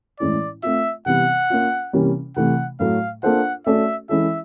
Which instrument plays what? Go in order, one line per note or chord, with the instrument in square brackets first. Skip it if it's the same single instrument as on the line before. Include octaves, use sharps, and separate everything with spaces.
[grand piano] A2 E3 G#3 C#4 E4 [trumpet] D5
[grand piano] A3 C4 F4 [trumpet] E5
[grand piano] C3 E3 G3 B3 [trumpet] F#5
[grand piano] A#3 C#4 F4
C3 E3 G3 A#3 C#4
[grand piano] C3 E3 A3 [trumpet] F#5
[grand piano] A2 F#3 A3 [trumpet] F5
[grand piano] A#3 D4 F4 A4 C5 [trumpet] F#5
[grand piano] A3 C#4 F#4 A4 D5 [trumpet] E5
[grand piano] E3 G#3 C#4 E4 A4 [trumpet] E5